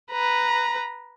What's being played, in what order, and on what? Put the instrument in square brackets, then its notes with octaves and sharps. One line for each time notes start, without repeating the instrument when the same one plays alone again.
[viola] B4 A#5